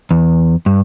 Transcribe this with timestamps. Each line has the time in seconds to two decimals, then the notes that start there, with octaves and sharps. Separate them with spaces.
0.11 E2
0.66 G2